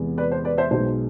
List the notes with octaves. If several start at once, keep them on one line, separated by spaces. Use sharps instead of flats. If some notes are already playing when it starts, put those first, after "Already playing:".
Already playing: E2 C3 G#3 B3
B4 D5
C5
B4 D5
C5 E5
B1 B2 G#3 C5